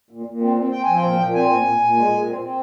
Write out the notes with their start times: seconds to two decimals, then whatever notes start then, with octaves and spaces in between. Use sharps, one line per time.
0.10 A#2
0.26 A#2
0.41 C4
0.57 C4
0.72 C4 G5
0.84 F3 G#5
0.95 G5
1.02 A#2
1.19 A#2
1.34 C4 G#5
1.49 A#2
1.65 A#2
1.80 A#2
1.96 G#3
2.11 A#2
2.26 C4
2.41 C4